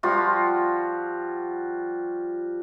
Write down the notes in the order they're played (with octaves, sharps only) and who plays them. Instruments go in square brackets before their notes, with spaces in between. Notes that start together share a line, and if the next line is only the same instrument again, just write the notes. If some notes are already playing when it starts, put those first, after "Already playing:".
[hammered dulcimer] F3 G3 F4 F#4